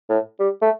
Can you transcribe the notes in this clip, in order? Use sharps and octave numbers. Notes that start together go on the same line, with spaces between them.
A2
G3
A3